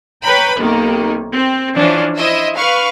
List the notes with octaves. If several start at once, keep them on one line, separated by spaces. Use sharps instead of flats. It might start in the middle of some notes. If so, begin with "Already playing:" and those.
B4 C#5 G5 A#5 B5
B1 C3 D#3 A#3
C4
E3 F3 C#4 D4 C5
E4 C5 D#5 E5
B4 F5 C#6 F6